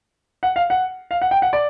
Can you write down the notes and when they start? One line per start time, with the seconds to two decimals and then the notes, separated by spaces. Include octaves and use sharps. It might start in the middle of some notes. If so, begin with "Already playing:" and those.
0.43 F#5
0.56 F5
0.70 F#5
1.11 F5
1.22 F#5
1.31 G5
1.42 F#5
1.53 D5